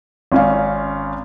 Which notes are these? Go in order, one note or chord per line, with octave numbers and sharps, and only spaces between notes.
G#1 C#4 F5